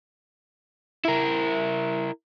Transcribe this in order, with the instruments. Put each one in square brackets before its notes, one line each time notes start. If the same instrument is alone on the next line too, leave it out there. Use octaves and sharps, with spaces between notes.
[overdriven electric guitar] E4 A#4